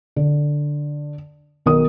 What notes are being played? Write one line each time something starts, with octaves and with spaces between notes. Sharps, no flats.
D3
B1 D#3 A#4 D#6